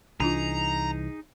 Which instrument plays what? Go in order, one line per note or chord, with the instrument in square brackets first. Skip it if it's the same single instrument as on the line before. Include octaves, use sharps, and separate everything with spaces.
[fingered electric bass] C2 E3 [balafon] D4 F4 [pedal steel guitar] D#4 G#4 [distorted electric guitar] A#5